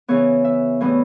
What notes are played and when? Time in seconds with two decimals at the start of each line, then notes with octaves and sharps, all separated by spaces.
0.08 C#3 E3 B3 C#5
0.45 E5
0.81 A2 E3 G3 B3